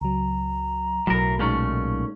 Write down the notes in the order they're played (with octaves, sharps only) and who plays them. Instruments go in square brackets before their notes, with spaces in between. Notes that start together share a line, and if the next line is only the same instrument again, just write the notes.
[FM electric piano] C#2 F#3 [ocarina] A#5
[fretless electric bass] B1 F#3 [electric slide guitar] A2 A#4
[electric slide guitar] A#2 A3 C#4 [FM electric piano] G#3 D#4